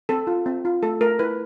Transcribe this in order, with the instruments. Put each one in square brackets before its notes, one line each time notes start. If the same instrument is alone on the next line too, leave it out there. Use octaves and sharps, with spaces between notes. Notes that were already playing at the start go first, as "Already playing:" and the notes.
[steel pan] C4 A4
F4
C4
F4
A3 A4
A3 A#4
E4 B4